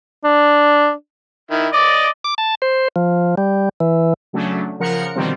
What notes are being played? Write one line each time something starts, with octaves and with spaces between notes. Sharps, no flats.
D4
D#3 E4
D5 D#5 D6
D6
A5
C5
F3
G3
E3
C#3 F#3 A3 C#4 D4
C#3 F3 A#4 F#5 C#7
B2 D3 D#3 F3 G3 C4